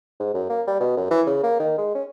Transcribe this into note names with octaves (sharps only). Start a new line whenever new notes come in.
G#2
F#2
A#3
G3
B2
F#2
E3
C#3
A#3
D#3
G#3
C#4